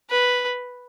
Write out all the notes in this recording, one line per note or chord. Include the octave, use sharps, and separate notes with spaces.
B4